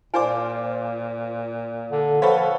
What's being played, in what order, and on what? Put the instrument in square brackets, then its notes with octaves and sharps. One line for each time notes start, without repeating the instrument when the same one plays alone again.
[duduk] A#2 [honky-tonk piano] F4 C5 D6 [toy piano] D5 G#5
[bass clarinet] D3
[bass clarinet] F3 [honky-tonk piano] A4 B4 C#5 [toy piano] F5 F#5